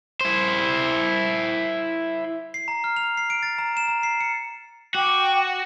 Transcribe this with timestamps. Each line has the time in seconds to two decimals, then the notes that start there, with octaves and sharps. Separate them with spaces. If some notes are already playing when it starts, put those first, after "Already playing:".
0.21 E4 C5
2.54 C7
2.68 A#5
2.84 F6
2.97 F7
3.17 C7
3.30 D7
3.43 A6
3.58 A#5
3.77 E7
3.88 A#5
4.03 C7
4.20 C#7
4.95 F#4 G5 D6